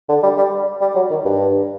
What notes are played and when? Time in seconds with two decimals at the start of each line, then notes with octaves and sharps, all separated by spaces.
0.09 D3
0.23 G3
0.37 G3
0.81 G3
0.95 F#3
1.11 D#3
1.25 G2